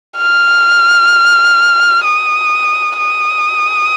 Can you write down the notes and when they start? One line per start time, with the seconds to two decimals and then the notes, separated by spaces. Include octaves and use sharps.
0.17 F6
2.04 D#6
2.98 D#6